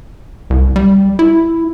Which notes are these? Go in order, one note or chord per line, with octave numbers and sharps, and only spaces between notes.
C2
G3
E4